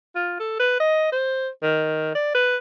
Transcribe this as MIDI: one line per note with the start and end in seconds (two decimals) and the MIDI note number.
0.15 0.36 65
0.40 0.55 69
0.60 0.75 71
0.80 1.09 75
1.12 1.49 72
1.63 2.12 51
2.15 2.30 74
2.35 2.57 71